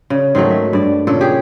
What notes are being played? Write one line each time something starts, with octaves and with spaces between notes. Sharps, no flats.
C#3
G#2 D#3 F#3 A3
E5
G2 D5
A#2 C#3 A4
G4 G#4